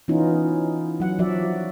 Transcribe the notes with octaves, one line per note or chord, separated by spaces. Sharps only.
E3 B3 C#4 D#4 F4
F#3 F#5
F3 F#3 F#4 D5 E5